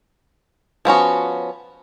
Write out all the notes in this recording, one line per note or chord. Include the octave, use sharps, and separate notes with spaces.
F3 B3 C#4 F#4